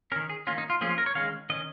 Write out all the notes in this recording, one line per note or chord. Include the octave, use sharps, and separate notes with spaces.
D#3 C#4 A#4
G#4
D#3 A#3 C#4 F4
D#4
F4
F3 A#3 C#4 G#4
F4
A#4
C#5
D#3 G#3 C#4 F5
D#3 C#4 D#5